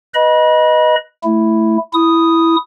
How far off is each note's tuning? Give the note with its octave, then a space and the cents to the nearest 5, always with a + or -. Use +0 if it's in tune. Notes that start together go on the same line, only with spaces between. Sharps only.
B4 +0 D#5 +0 B5 -35
A3 +0 E4 +0
E4 +0 D#6 +0